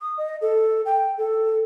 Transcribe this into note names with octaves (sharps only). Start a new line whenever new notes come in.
D#6
D#5
A4
G5
A4